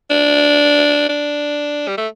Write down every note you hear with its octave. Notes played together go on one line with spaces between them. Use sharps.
D4
D4
G3
A3